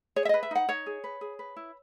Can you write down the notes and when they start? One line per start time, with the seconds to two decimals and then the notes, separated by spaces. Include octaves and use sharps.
0.16 G#4 C#5
0.25 E5
0.29 B4 D#5
0.43 E5
0.51 D#4 F#5
0.69 D#4 C#5
0.86 G#4
1.04 B4
1.21 G#4
1.39 B4
1.56 E4